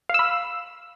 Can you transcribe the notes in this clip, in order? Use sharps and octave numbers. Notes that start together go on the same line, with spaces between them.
F5 B5 E6